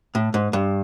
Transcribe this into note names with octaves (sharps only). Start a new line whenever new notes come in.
A2
G#2
G2